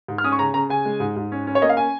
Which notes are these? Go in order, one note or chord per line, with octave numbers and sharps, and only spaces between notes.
G#2
F6
C#4 D#6
C#6
C#3 A#5
C#3 A#5
C#3 G#5
G#3
G#2
G#2
C#4
C#4
C#5
A#3 D#5
F5
C#4 G#5